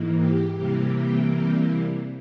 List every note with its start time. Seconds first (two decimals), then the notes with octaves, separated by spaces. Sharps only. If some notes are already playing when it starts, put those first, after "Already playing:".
Already playing: G#2 E3 A#3
0.18 G4
0.56 C3 E3 G3 A#3 G4
0.94 G4
1.32 G4